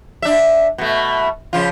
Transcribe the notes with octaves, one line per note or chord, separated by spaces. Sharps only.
D4 E5
B2 A3
C#3 F3 F4